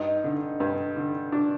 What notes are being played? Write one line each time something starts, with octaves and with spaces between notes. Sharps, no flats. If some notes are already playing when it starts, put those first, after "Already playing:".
Already playing: G2 D#4
D3
G2
D3
D4